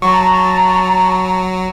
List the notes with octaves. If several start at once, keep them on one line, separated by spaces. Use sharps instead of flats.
F#3 A5 A#5 C#6